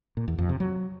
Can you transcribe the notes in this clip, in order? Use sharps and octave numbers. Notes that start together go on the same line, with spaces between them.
A#2
E2
F2
C3
F#3